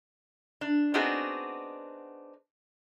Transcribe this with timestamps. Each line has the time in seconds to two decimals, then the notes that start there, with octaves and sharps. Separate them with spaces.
0.61 D4
0.94 B3 C4 D4 D#4 F#4 G#4